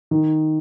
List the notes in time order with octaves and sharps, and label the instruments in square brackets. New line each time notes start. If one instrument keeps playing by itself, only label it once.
[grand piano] D#3